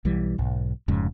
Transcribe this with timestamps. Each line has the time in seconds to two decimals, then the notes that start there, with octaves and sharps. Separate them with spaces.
0.05 B1 E3 G3
0.38 B1 G#2
0.88 F1 F2 G#2 C#3